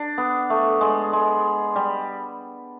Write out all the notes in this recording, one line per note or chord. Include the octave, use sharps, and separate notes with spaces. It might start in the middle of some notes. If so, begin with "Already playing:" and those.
Already playing: D4
B3
A3
G#3
G#3
G3